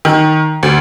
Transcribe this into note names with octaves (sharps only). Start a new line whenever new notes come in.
D#3
D2